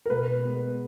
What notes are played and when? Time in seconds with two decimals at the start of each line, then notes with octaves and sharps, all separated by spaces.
0.06 A#4
0.10 B2 B4
0.45 G#3 B3